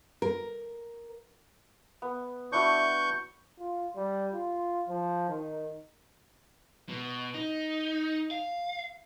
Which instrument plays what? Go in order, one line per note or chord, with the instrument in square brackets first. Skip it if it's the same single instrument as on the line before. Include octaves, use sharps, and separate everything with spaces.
[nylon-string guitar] A#4
[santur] B3
[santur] D4 E4 F#4 [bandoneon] C#6 G6
[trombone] F4
G3
F4
F3
D#3
[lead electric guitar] B2
D#4
F5